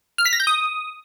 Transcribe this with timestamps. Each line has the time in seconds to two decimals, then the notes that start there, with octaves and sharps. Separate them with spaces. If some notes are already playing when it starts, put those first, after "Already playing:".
0.18 F6
0.26 B6
0.33 A#6
0.40 G6
0.47 D#6